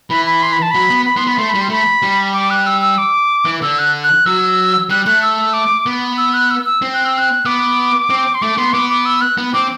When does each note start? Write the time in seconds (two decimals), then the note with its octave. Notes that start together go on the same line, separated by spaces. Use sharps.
0.10 E3 B5
0.26 B5
0.43 C6
0.53 B5
0.62 A5
0.71 F#3 B5
0.90 B3
1.06 B5
1.17 B3 C6
1.27 B3 B5
1.38 A3 C6
1.49 B5
1.55 G3
1.61 C6
1.70 A3 B5
2.02 G3
2.34 D6
2.50 F#6
2.66 E6
2.81 E6
2.98 D6
3.45 E3
3.62 D3 E6
3.79 F#6
4.04 F#6
4.26 F#3 E6
4.90 G3 F#6
5.06 A3 F#6
5.23 E6
5.53 D6
5.86 B3
6.18 E6
6.34 F#6
6.51 E6
6.66 E6
6.82 C4
6.94 F#6
7.05 E6
7.18 F#6
7.45 B3 D6
8.10 C4
8.35 C6
8.42 A3 D6
8.58 B3 C6
8.73 B3 D6
8.90 D6
9.06 E6
9.21 F#6
9.38 B3
9.54 C4 D6